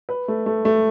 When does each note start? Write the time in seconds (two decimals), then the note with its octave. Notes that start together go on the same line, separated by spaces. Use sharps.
0.09 B4
0.28 A3
0.46 A3
0.65 A3